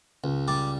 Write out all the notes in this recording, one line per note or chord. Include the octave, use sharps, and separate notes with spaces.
C#2
G3 D5